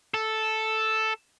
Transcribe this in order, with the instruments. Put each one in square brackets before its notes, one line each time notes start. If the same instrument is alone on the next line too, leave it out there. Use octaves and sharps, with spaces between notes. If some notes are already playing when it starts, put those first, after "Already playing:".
[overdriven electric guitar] A4